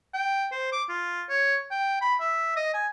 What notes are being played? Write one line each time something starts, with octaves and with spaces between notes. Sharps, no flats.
G5
C5
D6
F4
C#5
G5
B5
E5
D#5
G#5